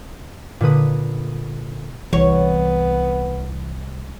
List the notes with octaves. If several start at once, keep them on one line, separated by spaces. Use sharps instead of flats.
A#2 D3 B4 D#6
C2 E3 B3 C#5